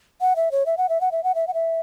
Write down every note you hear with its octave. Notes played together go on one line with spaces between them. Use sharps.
F#5
E5
C#5
E5
F#5
E5
F#5
E5
F#5
E5
F#5
E5